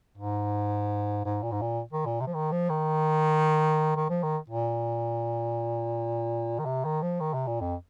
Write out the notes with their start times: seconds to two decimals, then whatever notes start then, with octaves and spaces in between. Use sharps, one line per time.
0.17 G#2
1.25 G#2
1.43 A#2
1.52 G#2
1.62 A#2
1.93 D#3
2.06 A#2
2.21 C3
2.27 F3
2.34 D#3
2.52 F3
2.69 D#3
3.96 D#3
4.10 F3
4.23 D#3
4.50 A#2
6.59 D#3
6.66 C3
6.85 D#3
7.02 F3
7.20 D#3
7.34 C3
7.47 A#2
7.61 F2